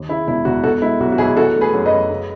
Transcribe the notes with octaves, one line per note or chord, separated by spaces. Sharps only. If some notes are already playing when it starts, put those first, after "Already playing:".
Already playing: D#2
C#3 E4
E1 E4
E1 F#4
B2 F#4 A4
G#3 E4
B1 F#4
F#4
B1 E4 G#4
E3 F#4 A4
A3
G#4 B4
F#2
B4 D#5
F#2
C#3